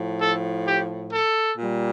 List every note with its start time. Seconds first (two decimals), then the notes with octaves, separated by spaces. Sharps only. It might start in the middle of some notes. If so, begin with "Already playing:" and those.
Already playing: A2 F3
0.19 A4
0.65 G4
1.11 A4
1.57 A#2 G3